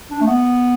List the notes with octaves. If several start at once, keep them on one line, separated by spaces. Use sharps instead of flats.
D4
A3
B3